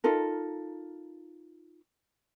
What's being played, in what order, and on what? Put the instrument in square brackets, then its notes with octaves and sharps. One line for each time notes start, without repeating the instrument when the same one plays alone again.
[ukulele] D#4 F4 A4 A#4